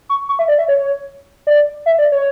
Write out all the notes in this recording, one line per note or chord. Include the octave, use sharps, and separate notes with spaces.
C#6
C#6
E5
D5
E5
C#5
D5
E5
D5
C#5